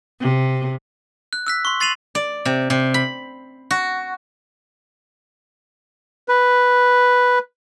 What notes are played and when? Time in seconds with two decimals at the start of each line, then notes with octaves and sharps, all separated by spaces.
0.21 C3
1.33 F#6
1.47 E6 F#6 B6
1.65 C6 C#6
1.80 C6 A6 C7 D#7 F7 F#7
2.15 D5
2.45 C3
2.70 C3
2.94 B5
3.71 F#4
6.29 B4